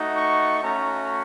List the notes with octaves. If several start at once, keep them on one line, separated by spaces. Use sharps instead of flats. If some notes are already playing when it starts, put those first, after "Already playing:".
Already playing: A3 D#4 F#4
C#6
A3 C#4 F#4 A#5